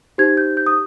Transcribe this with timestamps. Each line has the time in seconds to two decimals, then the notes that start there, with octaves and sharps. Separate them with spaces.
0.18 D#4 G4 C5 G#6
0.37 G6
0.57 G6
0.66 D#6